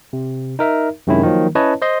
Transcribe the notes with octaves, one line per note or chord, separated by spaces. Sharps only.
C3
D#4 A#4 E5
F#2 C3 D#3 G#3 C#4 E4
D#3 F3 F#3 A#3
C#4 E4 B4 C#5 D#5 A5
C5 D#5 C6